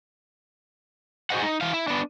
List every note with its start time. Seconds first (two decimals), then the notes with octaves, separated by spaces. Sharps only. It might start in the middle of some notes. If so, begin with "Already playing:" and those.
1.30 F#4 G#4 C5 D#5 F#5
1.42 D#4
1.61 E3 F5
1.73 E4
1.88 B3 D4